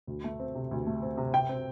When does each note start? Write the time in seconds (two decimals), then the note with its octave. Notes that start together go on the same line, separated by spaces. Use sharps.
0.07 D2
0.24 A3
0.40 C4
0.55 C3
0.71 D2
0.87 A3
1.02 C4
1.17 C3
1.33 C3 G5
1.49 C4